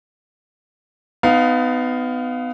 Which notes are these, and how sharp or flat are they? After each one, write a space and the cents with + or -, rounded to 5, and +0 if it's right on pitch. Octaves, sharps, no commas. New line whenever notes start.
B3 +30 D#4 +0 F5 +0